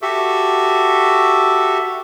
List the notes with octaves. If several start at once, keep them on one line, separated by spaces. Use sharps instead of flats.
F#4 G4 A4 E5